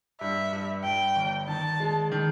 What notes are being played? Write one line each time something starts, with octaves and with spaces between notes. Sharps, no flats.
G2 E5
G2
G2 G5
G1
D#3 A5
G#3
D#3